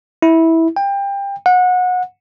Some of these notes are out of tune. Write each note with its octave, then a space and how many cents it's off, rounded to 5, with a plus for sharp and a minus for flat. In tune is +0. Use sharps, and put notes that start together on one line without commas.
E4 -15
G5 +25
F#5 -25